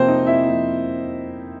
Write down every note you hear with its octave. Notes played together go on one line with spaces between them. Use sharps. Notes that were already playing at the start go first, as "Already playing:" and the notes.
Already playing: C3 F3 A#3 C4 C5
D#4 D#5
E4 E5
C3 F3 A#3